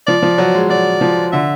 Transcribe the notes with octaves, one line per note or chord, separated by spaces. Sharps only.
F3 D5
F3
F#3
G#3
F#3 D5
F3
D3 E5